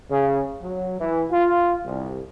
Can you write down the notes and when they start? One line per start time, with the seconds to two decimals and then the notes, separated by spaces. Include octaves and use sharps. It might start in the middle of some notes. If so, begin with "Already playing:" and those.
0.10 C#3
0.62 F#3
1.00 E3
1.31 F4
1.86 C2